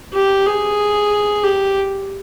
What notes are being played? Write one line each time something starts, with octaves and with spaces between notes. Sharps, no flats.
G4
G#4
G4